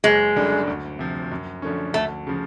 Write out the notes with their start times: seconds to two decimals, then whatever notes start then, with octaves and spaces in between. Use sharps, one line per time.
0.04 F#1 G#3
0.36 F#2 D3 G3
0.67 D2
0.99 C3 F3
1.32 F#2
1.62 D3 F3 A3 C#4
1.94 D2 A3
2.27 C#3 F3